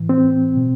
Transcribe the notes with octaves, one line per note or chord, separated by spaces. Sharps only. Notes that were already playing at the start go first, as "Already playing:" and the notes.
Already playing: A2 E3
C4
B2